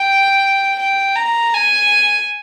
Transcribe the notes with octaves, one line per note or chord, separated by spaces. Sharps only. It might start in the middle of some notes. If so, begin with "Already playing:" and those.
Already playing: G5
G5
A#5
G#5